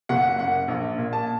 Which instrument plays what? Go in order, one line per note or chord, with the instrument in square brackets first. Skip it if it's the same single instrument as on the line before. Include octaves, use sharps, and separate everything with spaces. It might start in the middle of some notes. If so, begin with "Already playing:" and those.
[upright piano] F#1 F#5
F#2 F#5
A#1
A#2
A5